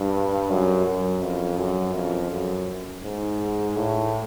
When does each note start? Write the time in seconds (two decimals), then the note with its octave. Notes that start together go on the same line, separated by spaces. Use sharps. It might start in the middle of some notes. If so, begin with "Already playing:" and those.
Already playing: G2
0.50 F#2
0.86 F#2
1.22 F2
1.58 F#2
1.95 F2
2.31 F#2
3.04 G#2
3.76 A2